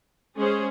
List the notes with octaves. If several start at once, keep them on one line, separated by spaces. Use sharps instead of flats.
G#3 C#4 G#4 C5